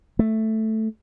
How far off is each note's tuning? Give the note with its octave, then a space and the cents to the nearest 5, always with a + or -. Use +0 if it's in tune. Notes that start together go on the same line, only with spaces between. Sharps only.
A3 +0